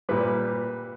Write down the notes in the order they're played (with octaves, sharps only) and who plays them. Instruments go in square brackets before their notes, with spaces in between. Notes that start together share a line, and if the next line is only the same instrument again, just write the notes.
[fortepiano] A#2 G3 B4